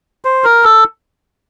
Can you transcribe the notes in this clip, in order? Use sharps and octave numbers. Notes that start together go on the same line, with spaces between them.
C5
A#4
A4